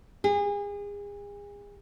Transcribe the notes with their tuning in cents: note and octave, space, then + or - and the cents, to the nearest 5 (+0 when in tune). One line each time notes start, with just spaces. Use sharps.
G#4 -35